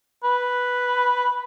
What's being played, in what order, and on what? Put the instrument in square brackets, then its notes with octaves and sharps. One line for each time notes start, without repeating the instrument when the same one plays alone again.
[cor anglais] B4